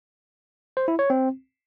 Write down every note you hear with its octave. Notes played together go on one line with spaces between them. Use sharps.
C5
E4
C#5
C4